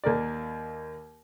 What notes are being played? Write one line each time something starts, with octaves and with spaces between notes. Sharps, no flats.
D#2 A#3 A#4 D5